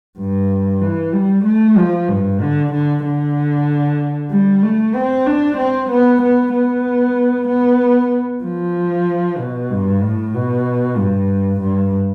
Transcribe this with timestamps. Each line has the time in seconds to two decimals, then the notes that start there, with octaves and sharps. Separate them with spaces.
0.19 G2
0.82 E3
1.13 G3
1.45 A3
1.77 F3
2.09 G2
2.41 D3
2.72 D3
3.04 D3
4.31 G3
4.63 A3
4.94 C4
5.27 D4
5.57 C4
5.90 B3
6.22 B3
6.53 B3
7.48 B3
8.43 F3
9.39 B2
9.71 G2
10.03 A2
10.34 B2
10.98 G2
11.61 G2